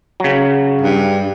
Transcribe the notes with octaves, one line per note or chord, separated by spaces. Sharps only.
C#3 F#3
G2